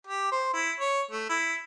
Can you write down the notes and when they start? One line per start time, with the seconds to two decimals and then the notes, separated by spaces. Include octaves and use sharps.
0.07 G4
0.32 C5
0.54 E4
0.80 C#5
1.11 A3
1.29 E4